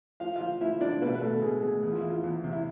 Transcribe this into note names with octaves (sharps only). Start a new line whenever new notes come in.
F3 F5
F3 F4 F5
F3 E4 E5
F3 D4 D5
B2 B3 B4
B4
B2 A3 A4
B2 G#3 G#4
G#3 B3 G#4
E2 G#4
F4
E3 E4
F3 F4
E2
C3
E4